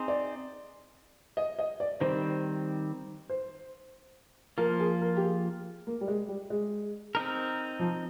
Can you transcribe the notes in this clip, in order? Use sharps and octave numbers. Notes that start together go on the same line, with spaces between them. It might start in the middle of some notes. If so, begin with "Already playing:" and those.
Already playing: C4 D#4 G#4 C5
D5
D#5
D#5
D5
D#3 G3 C4 C5
C5
F3 A#3 F4 A#4
G#4
A#4
G4
G#4
A#3
G3
G#3
G3
G#3
C4 D#4 A#4
F3